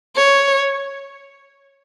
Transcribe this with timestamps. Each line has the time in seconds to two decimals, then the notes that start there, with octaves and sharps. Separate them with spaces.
0.16 C#5